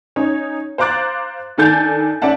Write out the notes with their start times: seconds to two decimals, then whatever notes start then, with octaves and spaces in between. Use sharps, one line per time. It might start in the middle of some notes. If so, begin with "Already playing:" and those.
0.16 C#4 D#4 C#5
0.78 C5 F5 A#5 D6 F#6 A6
1.58 D#3 D4 A4 G#5 G6 A6
2.22 C#4 D5 E5 F#5 A5